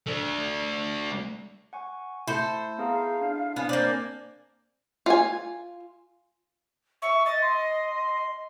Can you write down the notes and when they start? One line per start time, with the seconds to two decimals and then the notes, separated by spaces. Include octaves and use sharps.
0.07 A3 D4
1.73 F#5 G#5 C#6
2.27 A3 E4 A4 C5
2.78 B3 G#4 F5 A#5
3.21 D4
3.56 B3 C4 D4 G#5
3.69 A#3 C5 D5
5.06 F4 G#5
7.02 E5 C#6
7.26 D#5 A6
7.42 C6